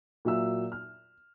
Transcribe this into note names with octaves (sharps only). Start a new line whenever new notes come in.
A#2 F#3 E5 E6
F6